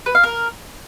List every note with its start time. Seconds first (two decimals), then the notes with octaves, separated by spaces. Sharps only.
0.06 B4
0.15 F5
0.23 A#4